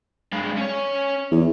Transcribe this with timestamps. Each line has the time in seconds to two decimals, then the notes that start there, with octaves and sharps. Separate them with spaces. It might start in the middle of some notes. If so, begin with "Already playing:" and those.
0.32 G2 G#3
0.57 C#4 C#5
1.31 E2